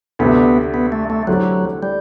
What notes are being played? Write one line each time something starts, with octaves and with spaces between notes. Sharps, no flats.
D2 C3 G3 B3
B3
A3
A3
D3 F#3 A3 C4 E4 G4
G3